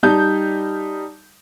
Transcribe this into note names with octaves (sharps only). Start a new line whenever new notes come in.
G3 D#4 A5 G6